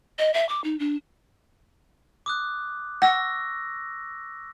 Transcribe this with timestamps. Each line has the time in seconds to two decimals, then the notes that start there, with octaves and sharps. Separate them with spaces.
0.19 D#5
0.34 E5
0.49 D6
0.64 D#4
0.79 D4
2.26 D6 D#6 F#6
3.02 F#5 C#6 E6 A#6